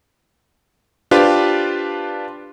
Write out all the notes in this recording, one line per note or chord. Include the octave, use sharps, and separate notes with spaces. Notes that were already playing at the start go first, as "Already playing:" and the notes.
D4 F4 G4 B4 C5